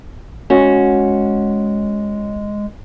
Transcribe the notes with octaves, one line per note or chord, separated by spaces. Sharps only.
G#3 C#4 F#4